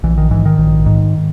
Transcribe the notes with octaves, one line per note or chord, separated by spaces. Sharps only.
A#1 E3
D#3
G#2 E3
D#3
A#1
G#2